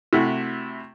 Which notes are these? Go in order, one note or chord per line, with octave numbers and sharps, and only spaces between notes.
C3 A3 E4 F#4